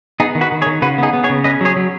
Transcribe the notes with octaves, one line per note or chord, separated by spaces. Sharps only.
B3 D#4 G#4
D#3
F#4 B4
D#3
G#4 C#5
D#3
C#3 F#4 B4
B3 D#4 G#4
B3
G#4 C#5
C#3
C#4 B4 D#5
F#3 G#4 C#5
F#3